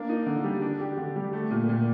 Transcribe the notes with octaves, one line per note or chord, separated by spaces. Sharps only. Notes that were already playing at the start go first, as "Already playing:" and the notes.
Already playing: A#3 D4
D#4
D3
G3
D4
G4
D3
G3
A3
A#2
A#2